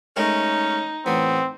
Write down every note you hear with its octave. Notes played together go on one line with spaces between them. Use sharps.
G#3 A3 C#4 D#4 A#4
A1 B3 C4